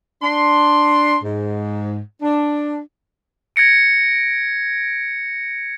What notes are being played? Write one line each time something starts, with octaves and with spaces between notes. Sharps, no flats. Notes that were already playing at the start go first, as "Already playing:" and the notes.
D4 C6
G#2
D4
G#6 A#6 C#7 D7